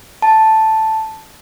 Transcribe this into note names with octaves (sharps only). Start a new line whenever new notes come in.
A5